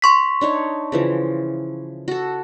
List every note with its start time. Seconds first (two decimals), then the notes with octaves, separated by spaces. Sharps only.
0.02 C6 C#6 B6
0.41 D4 D#4 C#5
0.92 C#3 E3 F3
2.08 F#4 A4